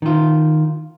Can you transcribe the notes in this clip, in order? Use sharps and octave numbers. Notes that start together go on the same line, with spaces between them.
D#3 F4